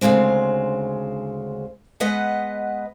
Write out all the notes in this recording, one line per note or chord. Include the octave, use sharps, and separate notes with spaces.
D2 G2 C#3 G#3 C4
G#3 B3 B4 D#5 F#5